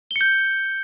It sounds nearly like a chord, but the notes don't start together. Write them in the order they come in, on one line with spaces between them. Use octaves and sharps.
G7 C#7 G6